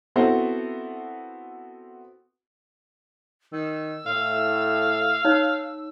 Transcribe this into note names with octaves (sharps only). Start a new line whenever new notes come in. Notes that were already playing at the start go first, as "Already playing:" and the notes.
B3 C4 E4 F#4 A4 C5
D#3 E6
A2 F5
D#4 C#5